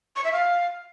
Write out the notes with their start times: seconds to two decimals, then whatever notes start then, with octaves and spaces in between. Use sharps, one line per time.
0.16 C#6
0.24 E5
0.33 F5